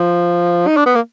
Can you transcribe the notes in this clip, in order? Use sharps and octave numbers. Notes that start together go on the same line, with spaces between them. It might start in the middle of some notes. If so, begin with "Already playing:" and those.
Already playing: F3
D#4
D4
B3
A#3